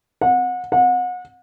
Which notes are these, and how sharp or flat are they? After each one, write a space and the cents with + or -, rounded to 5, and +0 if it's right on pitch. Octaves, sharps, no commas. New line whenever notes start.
F#5 -30
F#5 -35